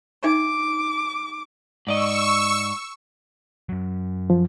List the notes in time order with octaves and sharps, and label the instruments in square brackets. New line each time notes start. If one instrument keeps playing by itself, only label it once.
[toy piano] D4 D#4 E5 [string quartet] D6
[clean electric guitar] G#2 D5 D#5 [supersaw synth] C#6 E6
[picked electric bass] F#2 F#3
[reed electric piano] F3